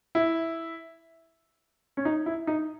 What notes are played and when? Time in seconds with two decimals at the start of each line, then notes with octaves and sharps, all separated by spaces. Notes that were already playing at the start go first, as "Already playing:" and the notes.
0.15 E4
1.97 C#4
2.05 D#4
2.26 E4
2.47 D#4